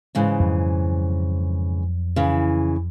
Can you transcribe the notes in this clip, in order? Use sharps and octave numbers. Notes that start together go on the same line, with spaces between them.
G#2 C#3 E3
F2 F#3
C#3 E3